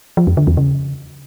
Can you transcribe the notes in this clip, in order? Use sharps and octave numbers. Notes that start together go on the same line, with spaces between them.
F3
F2
D3
E2
C#3